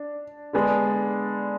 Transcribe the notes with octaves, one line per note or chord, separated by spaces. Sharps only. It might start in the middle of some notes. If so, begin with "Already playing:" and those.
Already playing: D4
D3 G#3 B3 D4 G#4